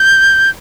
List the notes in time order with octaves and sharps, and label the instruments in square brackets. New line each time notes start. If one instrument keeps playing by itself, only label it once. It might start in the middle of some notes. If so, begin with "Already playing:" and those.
Already playing: [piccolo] G6